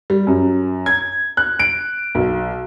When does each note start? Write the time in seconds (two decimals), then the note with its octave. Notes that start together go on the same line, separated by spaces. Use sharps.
0.10 G3
0.27 F#2
0.86 G#6
1.37 F#6
1.59 D7
2.15 B1